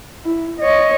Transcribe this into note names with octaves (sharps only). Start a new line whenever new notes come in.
E4
C#5 D#5